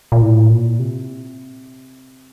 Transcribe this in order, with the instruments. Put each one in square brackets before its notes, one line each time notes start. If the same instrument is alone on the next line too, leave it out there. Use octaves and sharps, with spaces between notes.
[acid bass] A#2
A2
A#2
C3